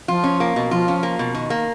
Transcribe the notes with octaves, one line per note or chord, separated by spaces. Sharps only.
F3 F4
C#4
A#3
B2
F3 F4
C#4
A#3
B2
D#3
A#3